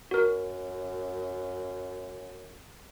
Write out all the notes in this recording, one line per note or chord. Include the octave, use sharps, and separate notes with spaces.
F#2 F#4 A#4